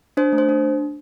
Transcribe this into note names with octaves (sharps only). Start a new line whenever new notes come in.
D4 C5
A3
C5
D4